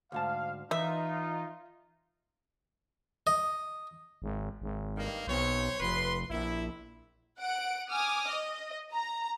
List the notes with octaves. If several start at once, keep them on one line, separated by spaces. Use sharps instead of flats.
D2 G#2 F5 A5
E3 D#4 F4 E5
D#5
G#1
G#1
G2 D#3 A#3
B1 C4 C5 C#5
F1 B4 C6
A#1 E4
F#5 D7
G#5 D6 D#6 F6
D#5
A#5